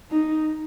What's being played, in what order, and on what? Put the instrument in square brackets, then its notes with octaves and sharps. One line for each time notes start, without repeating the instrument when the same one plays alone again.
[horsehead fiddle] D#4